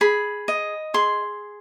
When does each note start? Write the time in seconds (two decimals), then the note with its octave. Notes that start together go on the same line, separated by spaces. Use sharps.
0.01 G#4 B5
0.48 D#5
0.94 G#4 C6